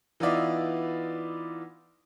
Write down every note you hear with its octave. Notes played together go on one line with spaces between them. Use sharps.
E3 B3 D#4 F4 D5 E5